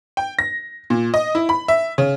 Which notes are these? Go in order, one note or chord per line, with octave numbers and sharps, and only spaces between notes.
G5
A#6
A#2
D#5
E4
B5
E5
C#3